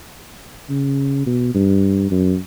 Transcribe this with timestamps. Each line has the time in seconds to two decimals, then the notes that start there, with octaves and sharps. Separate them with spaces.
0.70 C#3
1.27 B2
1.55 G2
2.11 F#2